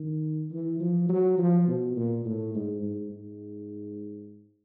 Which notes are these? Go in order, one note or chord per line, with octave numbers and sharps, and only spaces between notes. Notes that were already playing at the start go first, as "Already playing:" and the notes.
Already playing: D#3
E3
F3
F#3
F3
B2
A#2
A2
G#2
G#2
G#2